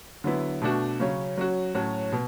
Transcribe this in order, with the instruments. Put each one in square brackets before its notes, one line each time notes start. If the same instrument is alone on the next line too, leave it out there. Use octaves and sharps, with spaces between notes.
[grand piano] D3 F#3 B3 E4
B2 A3 D4 F#4
C#3 F#3 C#4
F#3 C#4 F#4
A2 F#3 C#4 F#4
B2